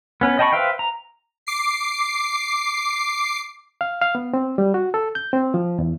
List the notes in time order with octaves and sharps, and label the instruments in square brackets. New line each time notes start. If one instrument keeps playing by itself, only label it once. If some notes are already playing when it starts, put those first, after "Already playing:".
[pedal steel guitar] B3 C#4 B4
D#5 G5 A5 B5 C#6
B4 C5 E5 F5 G5
A#5
[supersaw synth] D6 C7
[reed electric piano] F5
F5
B3
C4
G3
F#4
A4
G6
C4
F3
E2